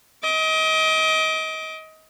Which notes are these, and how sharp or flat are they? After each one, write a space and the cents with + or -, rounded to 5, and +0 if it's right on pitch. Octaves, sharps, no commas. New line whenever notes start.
D#5 +30 D6 +0